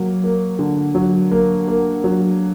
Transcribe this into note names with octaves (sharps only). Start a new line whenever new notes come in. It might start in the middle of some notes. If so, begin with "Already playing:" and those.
Already playing: F#3 A#3
A#3
D3
F#3
A#3
A#3
F#3